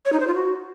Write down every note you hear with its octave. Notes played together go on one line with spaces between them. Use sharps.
C#5
D#4
C5
F4
F#4